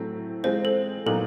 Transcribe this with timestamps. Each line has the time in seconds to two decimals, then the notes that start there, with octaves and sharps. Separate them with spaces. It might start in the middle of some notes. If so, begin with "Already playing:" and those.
Already playing: A2 F#3 A3 C4 E4
0.44 E3 G#3 C4 F4 C5
0.65 A4
1.06 A#2 F#3 B3 D#4 A4